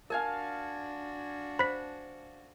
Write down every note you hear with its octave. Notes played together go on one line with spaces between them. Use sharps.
D4 F#4 A#4 F5 G#5 A5
C5 B5 B6